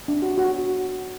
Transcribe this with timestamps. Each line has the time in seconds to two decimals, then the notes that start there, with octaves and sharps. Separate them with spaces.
0.08 D4
0.22 F#4
0.38 F#4